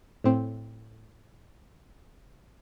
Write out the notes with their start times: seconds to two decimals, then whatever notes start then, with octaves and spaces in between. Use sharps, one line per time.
0.24 A2 C4